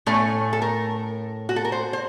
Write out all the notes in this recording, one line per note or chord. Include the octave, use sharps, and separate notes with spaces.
A2 A3 C#4 A4
A4
A#4
F#4
A4
A#4
C5
C5